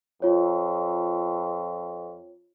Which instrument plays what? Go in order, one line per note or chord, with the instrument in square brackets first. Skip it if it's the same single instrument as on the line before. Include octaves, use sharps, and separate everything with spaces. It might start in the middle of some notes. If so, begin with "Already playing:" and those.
[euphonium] F2 [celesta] F4 C#5